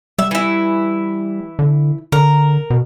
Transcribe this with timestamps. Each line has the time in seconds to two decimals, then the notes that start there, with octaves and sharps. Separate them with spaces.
0.19 G3 E5
0.31 E3 E4
1.59 D3
2.12 D3 A#4
2.70 B2